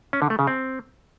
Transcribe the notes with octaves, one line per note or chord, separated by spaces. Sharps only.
C#4
D3
A3
C#3
C4